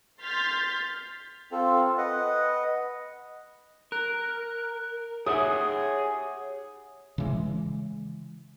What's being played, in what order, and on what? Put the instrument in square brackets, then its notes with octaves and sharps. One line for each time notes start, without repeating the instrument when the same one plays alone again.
[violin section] C6 F6 G6 A6 B6
[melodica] C4 F4 A4
B4 D#5 F#5
[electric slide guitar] A#4 [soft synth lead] F#6
[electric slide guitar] G4 E5 F#5 [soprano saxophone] G#4 [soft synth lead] C#5 [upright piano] D#6
[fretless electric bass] C#3 E3 G#3